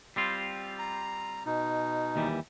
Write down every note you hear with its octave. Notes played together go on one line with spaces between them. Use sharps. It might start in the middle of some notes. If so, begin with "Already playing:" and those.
G3 C4 F4
A#5
B2 D#4
D#2 E3 G3